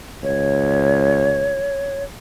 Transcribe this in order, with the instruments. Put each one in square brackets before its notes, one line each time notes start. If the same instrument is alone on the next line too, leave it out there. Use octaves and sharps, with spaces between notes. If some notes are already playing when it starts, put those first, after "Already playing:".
[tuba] C#2 [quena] C#5